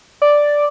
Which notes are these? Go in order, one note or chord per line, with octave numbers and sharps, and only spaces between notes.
D5